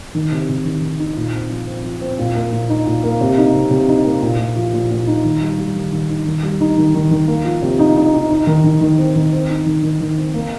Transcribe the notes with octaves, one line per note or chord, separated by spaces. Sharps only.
D#3
C3
C3
D#3
D#3
D#4
A#2
C4
F3
C4
F3
C4
A#2
A#3
A#2
D#4
A#2
A#3
C3
D#4
C3
C3
D#4
A#3
A#2
A#2
F3
A#2
A#2
D#4
D#3
G3
G3
D#3
D#3
D#4
D#3
G3
D#4
D#3
D#3
D#3
A#3
F3
C3
D#4
D#4
D#4
D#4
D#3
D#3
D#3
C4
D#3
C4
D#4
D#3
D#3
D#3
C4
A#3